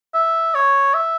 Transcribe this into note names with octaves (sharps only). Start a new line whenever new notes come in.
E5
C#5
E5